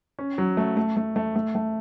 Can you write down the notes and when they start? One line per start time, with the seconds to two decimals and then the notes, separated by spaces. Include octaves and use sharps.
0.19 C#4
0.38 F#3
0.57 A3
0.77 A3
0.97 A3
1.16 A3
1.36 A3
1.55 A3